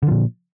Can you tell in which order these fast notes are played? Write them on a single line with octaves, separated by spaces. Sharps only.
D3 F3 A#2